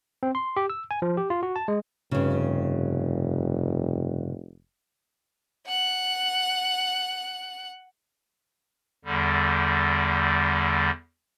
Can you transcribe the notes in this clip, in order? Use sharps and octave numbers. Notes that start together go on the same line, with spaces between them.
C4
C6
G4
E6
G#5
F3
G4
F4
F#4
A5
G#3
F1 G2 C#3
F#5 F#6
E2 D3 G3